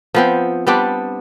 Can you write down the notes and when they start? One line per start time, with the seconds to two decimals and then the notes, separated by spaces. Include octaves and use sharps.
0.14 F3 B3 C4
0.67 G3 B3 C4 D4